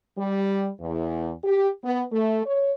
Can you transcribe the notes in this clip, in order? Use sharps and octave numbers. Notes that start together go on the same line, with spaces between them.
G3
E2
G4
B3
A3
C#5